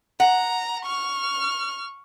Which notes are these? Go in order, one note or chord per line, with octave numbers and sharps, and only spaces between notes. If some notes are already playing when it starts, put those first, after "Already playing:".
F#5 A#5
C#6 F6